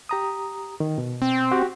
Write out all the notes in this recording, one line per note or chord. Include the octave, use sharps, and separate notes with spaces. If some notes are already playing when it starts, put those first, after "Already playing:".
G4 A#5 D#6
D#3
B2
C4
F#4 G4